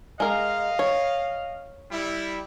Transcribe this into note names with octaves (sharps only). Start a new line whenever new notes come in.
G#3 A#4 D#5 F5
C#5
G3 E4